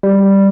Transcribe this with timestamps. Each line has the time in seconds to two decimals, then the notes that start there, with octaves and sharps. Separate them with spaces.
0.03 G3